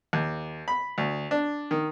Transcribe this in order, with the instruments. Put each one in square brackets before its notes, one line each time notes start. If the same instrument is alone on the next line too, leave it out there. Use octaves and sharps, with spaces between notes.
[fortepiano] D#2
B5
D2
D4
D#3